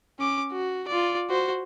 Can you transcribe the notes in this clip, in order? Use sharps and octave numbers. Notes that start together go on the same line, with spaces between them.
C#4 D6
F#4
F4 D5
F#4 C5